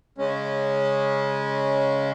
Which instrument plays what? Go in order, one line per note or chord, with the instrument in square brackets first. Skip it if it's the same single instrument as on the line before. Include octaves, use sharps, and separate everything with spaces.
[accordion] C#3 G#3 C#4